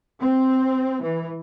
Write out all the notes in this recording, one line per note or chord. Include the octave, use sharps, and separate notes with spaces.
C4
E3